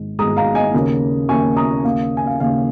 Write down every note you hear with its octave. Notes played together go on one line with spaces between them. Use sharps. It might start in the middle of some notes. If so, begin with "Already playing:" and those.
Already playing: G#1 G#2 G#3
G#1 G#2 G#3 A#5 D#6
F5 A#5
D#5 G#5
D#2 C#3 A#3
D#2 C#3 A#3 G#5 C#6
A#5 D#6
D#2 C#3 A#3 F5
G#5
F5
D#2 C#3 A#3 F5